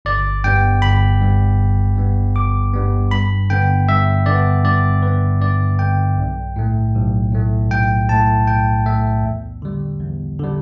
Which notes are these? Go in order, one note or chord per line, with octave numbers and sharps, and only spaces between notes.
G1 D5
G2 G3 B3 G5
G1 B5
G2 G3 B3
G1
G2 G3 B3
G1 D6
G2 G3 B3
G2 B5
D3 B3 G5
G2 E5
D3 B3 D5
G2 D5
D3 B3 B4
G2 D5
D3 B3 G5
B1
A2 A3
B1
A2 A3
B1 G5
A2 A3 A5
B1 G5
A2 A3 E5
E2
D3 G3
E2
D3 G3